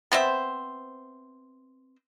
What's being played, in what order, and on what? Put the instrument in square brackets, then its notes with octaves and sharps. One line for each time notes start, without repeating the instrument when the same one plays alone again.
[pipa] B3 C4 C5 E5